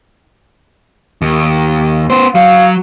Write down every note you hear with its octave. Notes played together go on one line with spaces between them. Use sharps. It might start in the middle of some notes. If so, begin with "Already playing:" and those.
D#2
B3 C5
F#3 F5